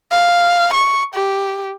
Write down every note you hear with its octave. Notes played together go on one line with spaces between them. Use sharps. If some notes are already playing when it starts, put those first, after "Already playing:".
F5
C#6
G4